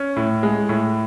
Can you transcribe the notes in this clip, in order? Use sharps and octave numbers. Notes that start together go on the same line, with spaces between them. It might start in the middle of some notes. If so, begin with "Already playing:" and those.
Already playing: C#4
A2
G#3
A2